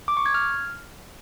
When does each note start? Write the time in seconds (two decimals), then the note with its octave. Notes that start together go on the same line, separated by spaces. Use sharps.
0.08 D6
0.17 C#6
0.26 G#6
0.34 F6